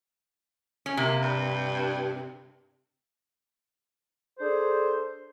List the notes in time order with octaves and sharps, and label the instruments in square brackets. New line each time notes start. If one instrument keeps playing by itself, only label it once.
[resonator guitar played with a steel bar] C#4
[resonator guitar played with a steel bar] C3 [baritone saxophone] A#3
[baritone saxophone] G2
[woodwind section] D4 G#4 A4 C5